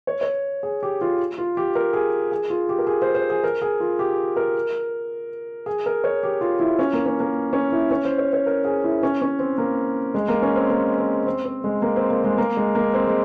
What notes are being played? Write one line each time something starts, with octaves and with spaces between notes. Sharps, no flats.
C#5
C#5
G#4
G4
F4
F4
G4
A#4
G#4
G#4
F4
G4
A#4
G#4
C5
C5
G#4
A#4
G#4
F4
G4
A#4
G#4
A#4
C#5
G4
F4
E4
C#4
A#3
C#4
A#3
C#4
E4
C#4
C5
C#5
C#5
A#4
G#4
E4
C#4
C#4
C4
A#3
G#3
A#3
C#4
C4
A#3
C4
C4
C4
G#3
A#3
C4
A#3
G#3
A#3
G#3
A#3
C4
G#3